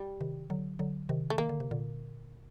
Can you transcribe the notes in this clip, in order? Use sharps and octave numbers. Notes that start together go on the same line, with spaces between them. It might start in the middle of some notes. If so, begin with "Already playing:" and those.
Already playing: G3
C3 D#3
D3 F#3
D3 F#3
C3 D#3
A3
D#3 A#3
D3
C3
A#2 D3